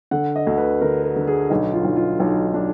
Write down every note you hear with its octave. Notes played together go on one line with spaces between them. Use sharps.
D3 F#5
D#5
D2
B4
D3 A#4
A#4
D3
G#4
B1 D#4
F4
B1
F4
B1 D#4
D4